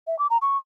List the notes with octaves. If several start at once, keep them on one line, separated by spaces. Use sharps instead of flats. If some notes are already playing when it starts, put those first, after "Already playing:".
E5
D6
A#5
C#6